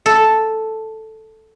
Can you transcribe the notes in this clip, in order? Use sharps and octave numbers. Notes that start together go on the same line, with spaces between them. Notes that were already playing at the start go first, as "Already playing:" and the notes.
A4